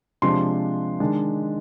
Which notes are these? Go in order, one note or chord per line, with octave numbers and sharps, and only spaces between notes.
C3 F3 G#3 D4 C6
D#3 G#3 D4